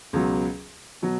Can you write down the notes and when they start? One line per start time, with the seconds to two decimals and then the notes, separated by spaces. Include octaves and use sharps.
0.13 C#2 B2 F#3
1.02 B2 F#3